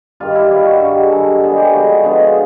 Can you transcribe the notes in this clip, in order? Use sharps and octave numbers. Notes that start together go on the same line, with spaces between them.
G2 D#3 G3 F4
E4
G2 D#3 G3 F4
F#4
G2 D#3 G3 F#4
G#4
G2 D#3 G3 A4
D3 F3 G#3 B3 G#4
G4
D3 F3 G#3 B3 F#4
D3 F3 G#3 B3